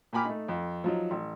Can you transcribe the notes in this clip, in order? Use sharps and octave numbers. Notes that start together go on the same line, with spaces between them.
A#2 G5 G#5 B5 D6 F6
A3 D#4
F2
F3 F#3 D#4
A1